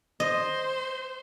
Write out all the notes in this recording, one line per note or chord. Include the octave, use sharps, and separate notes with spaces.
C5 D#5